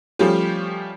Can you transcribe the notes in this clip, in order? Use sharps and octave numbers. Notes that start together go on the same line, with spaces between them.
F3 G3 A3 C#4 F4 G4